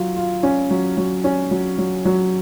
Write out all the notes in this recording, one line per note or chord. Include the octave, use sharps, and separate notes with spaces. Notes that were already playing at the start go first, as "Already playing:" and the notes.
Already playing: F#3 F4
F4
C#4
F#3
F#3
C#4
F#3
F#3
F#3